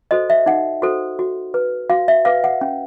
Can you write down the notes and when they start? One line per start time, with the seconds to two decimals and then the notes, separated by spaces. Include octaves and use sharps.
0.11 F#4 A4 C5 D#5
0.30 E5
0.46 D#4 F#5
0.82 F#4 A4 C5
1.19 F#4
1.54 B4
1.89 F#4 F5
2.08 E5
2.25 B4 F5
2.44 F#5
2.61 C#4